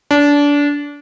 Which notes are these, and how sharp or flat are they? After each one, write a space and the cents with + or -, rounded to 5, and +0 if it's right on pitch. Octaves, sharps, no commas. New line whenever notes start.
D4 -25